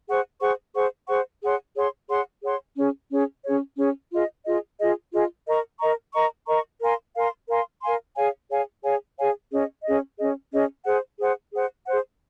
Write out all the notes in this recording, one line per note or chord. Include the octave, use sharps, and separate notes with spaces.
G#4 C5 F#5 C#6
G#4 C5 F#5 C#6
G#4 C5 F#5 C#6
G#4 C5 F#5 C#6
G#4 C#5 F#5 C6
G#4 C#5 F#5 C6
G#4 C#5 F#5 C6
G#4 C#5 F#5 C6
C#4 G#4 C#5
C#4 G#4 C#5
C#4 G#4 C#5
C#4 G#4 C#5
F4 G#4 D#5
F4 G#4 D#5
F4 G#4 D#5
F4 G#4 D#5
A#4 D#5 A#5 C#6
A#4 D#5 A#5 C#6
A#4 D#5 A#5 C#6
A#4 D#5 A#5 C#6
A#4 F5 G#5 C6
A#4 F5 G#5 C6
A#4 F5 G#5 C6
A#4 F5 G#5 C6
G#4 C#5 F5 G#5
G#4 C#5 F5 G#5
G#4 C#5 F5 G#5
G#4 C#5 F5 G#5
C#4 G#4 D#5
C#4 G#4 D#5
C#4 G#4 D#5
C#4 G#4 D#5
G#4 C5 F#5
G#4 C5 F#5
G#4 C5 F#5
G#4 C5 F#5